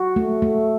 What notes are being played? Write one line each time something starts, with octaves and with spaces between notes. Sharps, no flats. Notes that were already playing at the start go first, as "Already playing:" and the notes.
Already playing: F#4
A3
A3